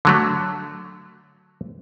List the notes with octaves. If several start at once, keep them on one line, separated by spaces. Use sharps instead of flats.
D3 F#3 A3